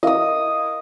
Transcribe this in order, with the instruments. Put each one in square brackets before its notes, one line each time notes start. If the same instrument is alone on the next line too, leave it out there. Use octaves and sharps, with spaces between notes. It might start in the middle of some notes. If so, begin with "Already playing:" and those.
[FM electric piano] E4 A#4 F5 [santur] D#5 D#6